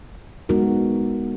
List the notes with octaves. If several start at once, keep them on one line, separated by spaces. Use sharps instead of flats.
G#3 B3 D#4 F#4 A#4